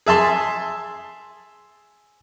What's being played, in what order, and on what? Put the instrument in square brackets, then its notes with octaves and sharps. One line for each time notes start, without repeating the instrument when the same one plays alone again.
[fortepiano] G#4 E5 A5 C6